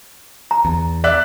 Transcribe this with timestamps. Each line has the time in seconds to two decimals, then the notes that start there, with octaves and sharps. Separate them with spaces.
0.51 A#5
0.65 E2
1.04 D5 E5 F#6